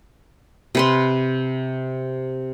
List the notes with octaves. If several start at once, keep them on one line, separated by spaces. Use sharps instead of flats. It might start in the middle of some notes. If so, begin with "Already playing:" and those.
C3 B4 C6